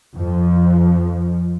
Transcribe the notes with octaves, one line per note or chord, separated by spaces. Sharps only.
F2 F3